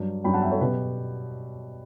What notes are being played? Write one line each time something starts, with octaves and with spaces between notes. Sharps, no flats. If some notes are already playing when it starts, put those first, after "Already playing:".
Already playing: G2 F#3
G2 F#3 G5 B5
F#5 A5
E5 G5
A4 C#5
B2 F#3 G4 B4